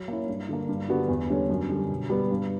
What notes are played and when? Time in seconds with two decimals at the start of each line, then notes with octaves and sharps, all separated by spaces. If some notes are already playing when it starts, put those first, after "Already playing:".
Already playing: F#3
0.08 A#3 C#4 E4
0.28 G2
0.49 D3 A#3
0.69 G2
0.89 D3 G3 B3 F#4
1.08 E2
1.30 D3 G3 C#4
1.50 F#2
1.69 D3 G3
1.90 B2
2.10 G3 B3
2.31 G2